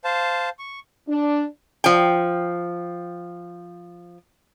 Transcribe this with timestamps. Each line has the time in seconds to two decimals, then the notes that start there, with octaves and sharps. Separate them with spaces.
0.04 C5 F5 A5
0.59 C#6
1.08 D4
1.84 F3 G5